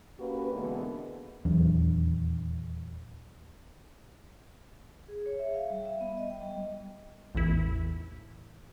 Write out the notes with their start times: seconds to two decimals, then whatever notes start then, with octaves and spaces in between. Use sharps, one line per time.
0.19 A#3 C#4 F#4 G4 B4
0.53 B2 D3 E3 G#3 A#3 B3
1.45 D#1 E2 F#3 D4
5.08 G#4
5.26 C#5
5.39 E5
5.54 F5
5.70 G3
5.85 E5
6.01 B3
6.17 D#5
6.30 G5
6.42 G3
7.35 A1 E2 E4